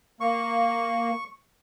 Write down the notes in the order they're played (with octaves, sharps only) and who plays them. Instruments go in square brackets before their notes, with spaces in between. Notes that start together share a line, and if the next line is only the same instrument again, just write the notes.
[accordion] A#3 [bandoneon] C#6